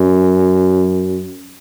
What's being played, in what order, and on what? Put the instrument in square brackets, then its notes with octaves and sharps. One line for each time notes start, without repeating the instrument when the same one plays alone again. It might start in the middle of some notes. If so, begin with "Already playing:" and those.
Already playing: [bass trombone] F#2